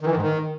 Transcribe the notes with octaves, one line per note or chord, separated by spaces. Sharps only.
D#3
E3
D#3
G#2
D#3